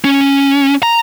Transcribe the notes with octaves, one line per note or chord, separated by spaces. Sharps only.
C#4
A#5